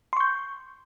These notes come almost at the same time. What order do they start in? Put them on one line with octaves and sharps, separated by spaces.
C6 C#6 G6